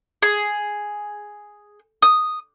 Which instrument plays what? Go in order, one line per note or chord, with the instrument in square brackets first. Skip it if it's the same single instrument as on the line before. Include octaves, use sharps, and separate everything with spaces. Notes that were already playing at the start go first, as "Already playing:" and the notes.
[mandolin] G#4
D#6